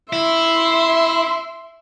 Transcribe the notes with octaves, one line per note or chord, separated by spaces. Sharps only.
E4 E5 C6